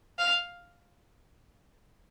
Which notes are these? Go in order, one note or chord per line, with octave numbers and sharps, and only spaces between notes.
F5